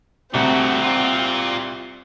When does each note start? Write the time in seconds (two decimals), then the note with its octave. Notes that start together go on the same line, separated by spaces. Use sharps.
0.34 C2 A3 C4 F#4
0.82 F4 D5